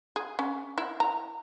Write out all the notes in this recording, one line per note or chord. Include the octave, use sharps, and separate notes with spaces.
G#4
C#4
E4
A#5